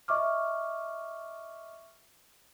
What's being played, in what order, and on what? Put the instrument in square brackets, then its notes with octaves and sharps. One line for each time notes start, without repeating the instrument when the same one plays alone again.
[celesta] D#5 E5 C#6 D6 F6